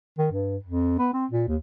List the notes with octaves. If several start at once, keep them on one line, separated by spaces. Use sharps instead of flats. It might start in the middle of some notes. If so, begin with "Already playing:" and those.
D#3
G2
F2
B3
C4
A#2
D#2